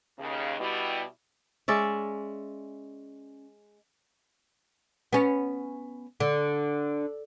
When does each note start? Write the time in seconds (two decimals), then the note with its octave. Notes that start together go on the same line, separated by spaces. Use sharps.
0.19 D#2 C#3
0.59 B2 G3 E4
1.68 G#3 C#4 D5 E5
5.13 B3 C#4
6.20 D3